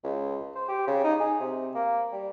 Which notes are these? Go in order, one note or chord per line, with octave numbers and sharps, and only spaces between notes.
C#2
C5
G4
C#3
D#4
G#4
C3
A#3
G3